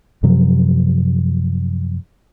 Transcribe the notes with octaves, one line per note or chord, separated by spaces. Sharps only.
F#2 C3 F3 F#3